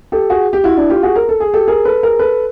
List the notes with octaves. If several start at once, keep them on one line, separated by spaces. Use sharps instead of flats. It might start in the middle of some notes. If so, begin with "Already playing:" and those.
G4 A4
F#4 G#4
G4
E4 F#4
D4 E4
F4 G4
F#4 G#4
A#4
A4
G#4
G4 A4
G#4 A#4
A4 B4
G#4 A#4
A4 B4